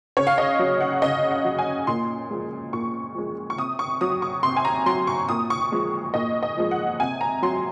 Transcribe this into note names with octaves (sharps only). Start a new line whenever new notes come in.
C#3 C#5
F5
D#5
F#3
F#5
C#3 D#5
F#5
F#3
G#5
A#2 C6
F3 G#3
A#2 C#6
F3 G#3
C#6
C3 D#6
C#6
F#3 D#6
C#6
C3 C6
G#5
A#5
F#3 C6
C#6
A#2 D#6
C#6
F3 G#3
A#2 D#5
D#5
F3 G#3
F#5
C3 G#5
A#5
F#3 C6